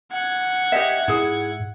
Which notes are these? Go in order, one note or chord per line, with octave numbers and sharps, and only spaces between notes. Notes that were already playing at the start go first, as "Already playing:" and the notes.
F#5 G#6
G4 D#5 E5
G#2 E4 G#4